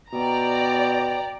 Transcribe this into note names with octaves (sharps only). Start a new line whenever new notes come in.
B2 D5 G5 A#5